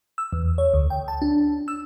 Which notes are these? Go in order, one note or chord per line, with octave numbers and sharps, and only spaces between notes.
E6
E2
C#5
D2
G5
A5
D4
E6